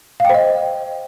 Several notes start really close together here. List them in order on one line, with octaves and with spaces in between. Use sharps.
F5 G5 C5 D#5